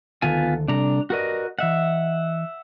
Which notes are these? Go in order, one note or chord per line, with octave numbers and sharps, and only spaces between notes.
D2 D#3 B3 F4 A4 G#5
C3 G3 D4 A4 A#5
F#4 G4 A#4 B4 D5 D#5
E3 D#5 E5 F#5